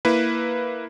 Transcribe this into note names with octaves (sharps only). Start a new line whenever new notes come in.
A#3 E4 B4